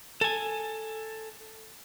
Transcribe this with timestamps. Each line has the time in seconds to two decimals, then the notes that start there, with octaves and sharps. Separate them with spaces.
0.21 A4 G#5